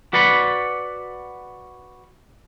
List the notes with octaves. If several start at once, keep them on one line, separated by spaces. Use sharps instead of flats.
F#4 B4 D5 F#5 B5